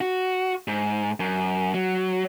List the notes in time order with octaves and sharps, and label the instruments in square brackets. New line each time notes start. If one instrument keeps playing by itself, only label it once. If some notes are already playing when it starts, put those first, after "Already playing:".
[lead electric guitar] F#4
G#2
F#2
F#3